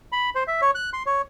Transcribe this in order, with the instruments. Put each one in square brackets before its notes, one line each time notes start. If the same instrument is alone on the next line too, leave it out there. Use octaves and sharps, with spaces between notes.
[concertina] B5
C5
E5
C#5
F#6
C6
C#5